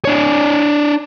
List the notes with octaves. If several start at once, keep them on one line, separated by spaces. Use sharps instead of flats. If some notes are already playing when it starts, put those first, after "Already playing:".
D4 C#5